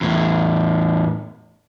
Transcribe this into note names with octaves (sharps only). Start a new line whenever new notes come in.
E2 A2